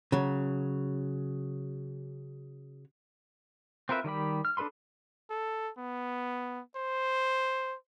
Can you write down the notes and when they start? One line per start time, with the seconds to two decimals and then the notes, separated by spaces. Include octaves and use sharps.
0.12 C#3 F#3
3.89 C4 F4 A#4 B4 E5
4.04 D#3 G3 G4 B5
4.45 F6
4.57 D4 A4 B4 B5 C6
5.30 A4
5.78 B3
6.76 C5